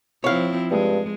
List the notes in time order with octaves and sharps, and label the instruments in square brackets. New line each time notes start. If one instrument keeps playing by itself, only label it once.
[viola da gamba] F3 C4 E4 [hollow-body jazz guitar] C#5 F5
[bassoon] G2 [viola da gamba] G#3